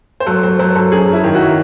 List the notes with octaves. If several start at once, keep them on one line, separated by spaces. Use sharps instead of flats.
C5
F#3 A4
F#3 C5
F#3 C5
F#3 A4
F#2 G#4
F#2
E4
D#3
F#4